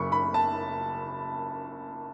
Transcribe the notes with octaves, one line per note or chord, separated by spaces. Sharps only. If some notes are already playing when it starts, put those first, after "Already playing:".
Already playing: F#1 F#2 C#3 B5 C#6
B5
A5